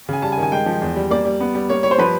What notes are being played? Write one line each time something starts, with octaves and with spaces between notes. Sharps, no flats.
C#3 G#5
G3 A5
G#5
D#3
G#5
G#3 G5
F3
E2
G3
A#3 D5
G3
B3
G3
A#3 C#5
G3 C#5
C5
F3 B4